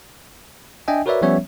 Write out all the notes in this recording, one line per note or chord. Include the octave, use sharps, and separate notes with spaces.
D4 D#5 E5 G5 G#5
F#4 A#4 B4 C#5 D5 E5
F3 G3 B3 C#4 C#5 E5